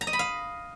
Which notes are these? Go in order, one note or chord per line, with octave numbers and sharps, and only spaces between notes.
A#5
D#5
B5
F5